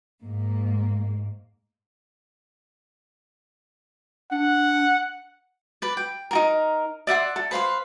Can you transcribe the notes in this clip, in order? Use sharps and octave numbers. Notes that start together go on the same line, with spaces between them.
G#2 A#3
D4 F#5
B4 D5
G5
D#4 F#4 A#4
D5 E5 F#5 C6
A4
B4 C5 F5 C6